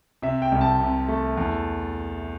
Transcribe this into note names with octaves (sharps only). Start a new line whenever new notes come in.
C3 E5
G5
C2
A5
C3
A3
E2